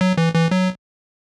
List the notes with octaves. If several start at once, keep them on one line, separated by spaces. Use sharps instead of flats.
F#3
E3
E3
F#3